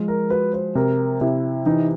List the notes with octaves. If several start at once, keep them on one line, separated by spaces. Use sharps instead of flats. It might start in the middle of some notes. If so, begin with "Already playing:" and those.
Already playing: F3 G#3
A#4
F#4 B4
C5
C3 A#4
C3 E4
E3 D#4